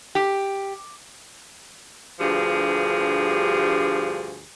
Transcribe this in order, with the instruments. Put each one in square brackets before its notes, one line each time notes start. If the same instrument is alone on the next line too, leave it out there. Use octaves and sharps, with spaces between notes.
[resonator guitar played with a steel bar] G4
[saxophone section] D2 G2 F3 G4 G#4